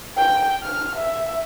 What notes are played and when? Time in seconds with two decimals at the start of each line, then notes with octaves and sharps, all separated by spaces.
0.17 G5
0.63 F6
0.96 E5